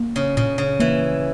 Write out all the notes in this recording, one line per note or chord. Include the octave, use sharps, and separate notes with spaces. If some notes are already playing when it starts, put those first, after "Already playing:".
Already playing: A#3
C#3
A#2 C#3
C#3
E3 A#3